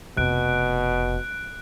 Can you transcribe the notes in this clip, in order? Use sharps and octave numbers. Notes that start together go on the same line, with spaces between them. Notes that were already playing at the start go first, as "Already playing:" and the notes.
F1 B2 F#6 D7